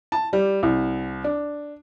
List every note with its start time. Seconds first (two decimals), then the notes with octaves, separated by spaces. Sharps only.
0.12 A5
0.33 G3
0.63 C2
1.24 D4